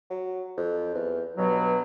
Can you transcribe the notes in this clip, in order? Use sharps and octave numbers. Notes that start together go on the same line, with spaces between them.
F#3
F2
E2
G2 B2 F#3